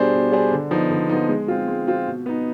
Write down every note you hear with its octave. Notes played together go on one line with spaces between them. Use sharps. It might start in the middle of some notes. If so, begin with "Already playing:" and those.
Already playing: B2 G3 D4 G#4 C5
B2
G3 D4 G#4 C5
D3
F3 B3 D#4
D3
F3 B3 D#4
G#3
C4 F4
G#3
C4 F4
B2
B3 D#4